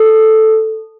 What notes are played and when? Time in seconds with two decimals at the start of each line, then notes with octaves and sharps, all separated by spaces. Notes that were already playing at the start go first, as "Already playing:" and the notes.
Already playing: A4